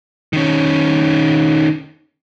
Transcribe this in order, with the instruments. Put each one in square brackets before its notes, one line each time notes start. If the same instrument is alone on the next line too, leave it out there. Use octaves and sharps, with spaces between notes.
[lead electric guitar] D#3 C#4